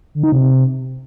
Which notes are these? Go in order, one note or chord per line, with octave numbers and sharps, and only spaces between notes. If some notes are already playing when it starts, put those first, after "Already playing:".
D3
D#4
C3